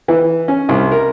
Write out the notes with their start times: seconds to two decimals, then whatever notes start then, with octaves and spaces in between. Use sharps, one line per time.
0.08 E3
0.48 C#4
0.69 C2
0.92 A#4